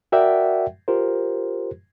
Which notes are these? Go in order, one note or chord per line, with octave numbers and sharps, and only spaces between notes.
F#4 A#4 D5 E5 F#5 G5
F4 G4 A#4 C5